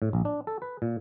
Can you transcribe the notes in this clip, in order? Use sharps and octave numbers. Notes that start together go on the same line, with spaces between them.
A2
A#1
D4
A4
B4
A#2